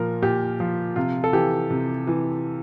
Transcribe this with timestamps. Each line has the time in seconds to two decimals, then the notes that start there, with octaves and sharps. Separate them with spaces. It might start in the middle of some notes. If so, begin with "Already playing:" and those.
Already playing: A#2 F3 A#4
0.23 A#2 G4
0.60 F3
0.96 C3 F4
1.24 A4
1.33 E3 G4
1.70 C3
2.07 E3